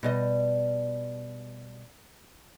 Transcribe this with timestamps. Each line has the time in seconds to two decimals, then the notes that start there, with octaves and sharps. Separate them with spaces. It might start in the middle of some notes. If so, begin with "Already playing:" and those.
0.03 B2 G3 D#5